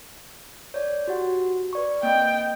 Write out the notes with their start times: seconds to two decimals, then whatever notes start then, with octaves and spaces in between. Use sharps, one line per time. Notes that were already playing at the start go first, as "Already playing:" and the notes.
0.74 C#5 D5
1.08 F#4 G4 F#5
1.73 B4 D5 C#6
2.03 A#3 C4 D#5 G5